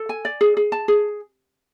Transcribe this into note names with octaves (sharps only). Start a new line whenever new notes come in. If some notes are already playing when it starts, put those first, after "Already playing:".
Already playing: A4
G#5
D5
G#4
G#4
A5
G#4